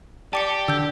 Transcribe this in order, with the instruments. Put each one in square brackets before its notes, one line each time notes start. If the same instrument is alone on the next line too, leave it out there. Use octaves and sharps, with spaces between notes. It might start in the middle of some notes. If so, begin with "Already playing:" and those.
[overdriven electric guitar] G4 [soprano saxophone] D5 [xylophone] A5 D6 C#7
[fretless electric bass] D3 [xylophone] E6 G6